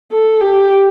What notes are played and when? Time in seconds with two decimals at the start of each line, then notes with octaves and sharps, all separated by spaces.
0.12 A4
0.40 G4